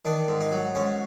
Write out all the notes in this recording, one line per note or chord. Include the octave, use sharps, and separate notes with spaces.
D#3 D4
G#2
D#4
F#3
G#2 C#4